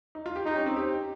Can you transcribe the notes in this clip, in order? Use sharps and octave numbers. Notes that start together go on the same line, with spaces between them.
D#4
F4
G4
D#4 G4
C#4
C4
G4